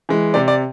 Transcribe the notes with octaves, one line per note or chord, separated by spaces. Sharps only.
E3 G#3
C3 D5
D5